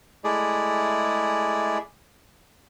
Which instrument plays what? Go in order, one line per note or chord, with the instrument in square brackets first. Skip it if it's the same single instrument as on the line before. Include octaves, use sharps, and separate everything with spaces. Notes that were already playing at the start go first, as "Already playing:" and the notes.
[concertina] G#3 A3 E4 G#4 D5